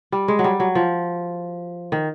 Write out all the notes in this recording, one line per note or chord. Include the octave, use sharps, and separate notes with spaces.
G3
G#3
F#3
G3
F#3
F3
D#3